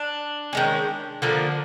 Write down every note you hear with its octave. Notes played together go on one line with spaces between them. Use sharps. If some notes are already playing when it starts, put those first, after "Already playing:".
Already playing: D4
D#3 G#3 C#4
D3 F3 A#3 D4